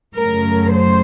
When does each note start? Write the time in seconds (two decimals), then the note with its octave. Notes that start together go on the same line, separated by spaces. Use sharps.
0.15 F#2 C#3 F#3 A3 A#4
0.73 C5